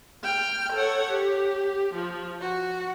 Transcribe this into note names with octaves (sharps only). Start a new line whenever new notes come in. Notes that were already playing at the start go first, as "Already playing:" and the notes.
G5 F6
A4 C#5 F#5
G4
F3
F#4